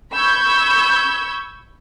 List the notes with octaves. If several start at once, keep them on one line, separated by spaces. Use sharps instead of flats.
B5 C#6 E6 G6 G#6